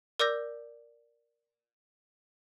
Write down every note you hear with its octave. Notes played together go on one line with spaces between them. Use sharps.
A#4 D5 D6 E6 G6 A#6